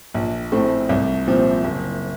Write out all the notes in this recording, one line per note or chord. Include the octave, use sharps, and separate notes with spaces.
A#1
A2 A3 C4
C2
A#2 F3 C4
F#1